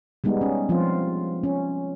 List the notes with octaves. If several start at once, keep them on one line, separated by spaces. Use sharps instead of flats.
G3 G#3 B3 D#4
C#4
F3 C4 F4
C#4